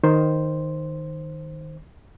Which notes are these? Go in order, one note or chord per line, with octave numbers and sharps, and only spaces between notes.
D#3 C5